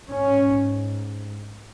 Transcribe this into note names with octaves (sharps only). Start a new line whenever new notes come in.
G#2 C#4